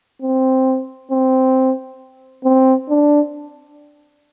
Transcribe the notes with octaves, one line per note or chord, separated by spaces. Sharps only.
C4
C4
C4
D4